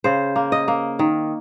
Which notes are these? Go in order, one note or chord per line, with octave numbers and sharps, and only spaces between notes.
C#3 C5
A#3
D#5
A#3
D#3